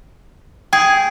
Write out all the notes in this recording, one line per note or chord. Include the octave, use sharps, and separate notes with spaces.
G#4 G5